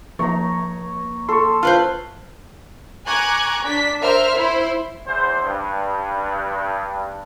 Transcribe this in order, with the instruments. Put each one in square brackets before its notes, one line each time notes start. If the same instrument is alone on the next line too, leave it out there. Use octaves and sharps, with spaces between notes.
[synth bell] F3 A#3 [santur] C#5 A#5
[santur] A4 [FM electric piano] C6 C#6
[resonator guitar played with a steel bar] F4 B4 C5
[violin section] G#5 A#5 C#6 D6 F#6 G#6
D4 B6
A#4 C5 E5 F6
E4 C5
[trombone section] E2 C5
G2